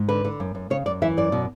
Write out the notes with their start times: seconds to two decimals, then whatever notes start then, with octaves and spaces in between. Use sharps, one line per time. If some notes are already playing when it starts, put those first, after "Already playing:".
Already playing: G#2
0.09 D3 B4
0.25 D3
0.40 F#2
0.55 F#2
0.70 C#3 C#5
0.86 F#2 D5
1.02 E3 E5
1.17 F#2 D5
1.32 B2